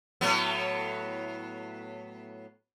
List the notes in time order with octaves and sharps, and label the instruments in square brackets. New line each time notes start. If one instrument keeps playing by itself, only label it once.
[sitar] A2 F#3 B3